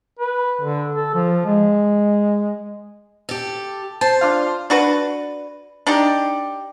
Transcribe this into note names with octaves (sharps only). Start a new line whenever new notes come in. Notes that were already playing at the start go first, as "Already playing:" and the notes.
B4
D3
A4
F3
G#3
G4 A4
C5 A5
D4 F4 F5
D4 F#4 B4
D4 D#4 G4